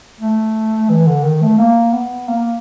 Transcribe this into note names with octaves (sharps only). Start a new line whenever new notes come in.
A3
E3
D3
D#3
A3
A#3
B3
A#3